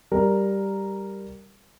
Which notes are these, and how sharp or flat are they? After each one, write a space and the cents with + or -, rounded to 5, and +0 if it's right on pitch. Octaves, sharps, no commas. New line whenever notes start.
G3 +0 A#4 +0